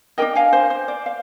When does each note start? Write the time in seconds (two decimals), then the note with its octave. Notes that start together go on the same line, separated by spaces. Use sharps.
0.18 D4 G4 A#4 D#5 G5
0.35 F5 G#5
0.53 C5
0.70 C5
0.88 D5
1.06 F5